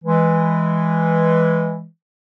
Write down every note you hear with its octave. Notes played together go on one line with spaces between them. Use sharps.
E3 G#3